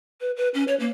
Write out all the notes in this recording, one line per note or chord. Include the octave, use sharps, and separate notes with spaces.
B4
B4
C#4
C#5
A#3